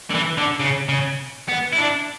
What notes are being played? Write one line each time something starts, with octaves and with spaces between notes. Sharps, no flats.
D3
E3
D3
C#3
C#3
B3
E4
D4